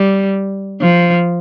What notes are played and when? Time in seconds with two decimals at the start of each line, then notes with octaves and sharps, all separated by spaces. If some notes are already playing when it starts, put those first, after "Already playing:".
Already playing: G3
0.81 F3